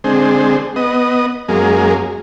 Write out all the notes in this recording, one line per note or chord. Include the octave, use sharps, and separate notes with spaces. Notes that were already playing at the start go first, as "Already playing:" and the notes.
D3 G#3 C4
B3 D#5
F#2 G#3 A#3